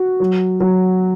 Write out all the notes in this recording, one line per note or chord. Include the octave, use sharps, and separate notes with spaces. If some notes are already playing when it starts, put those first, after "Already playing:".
Already playing: F#4
F#3
F#3